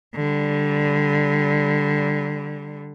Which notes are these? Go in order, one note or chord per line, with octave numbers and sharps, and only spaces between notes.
D3 G3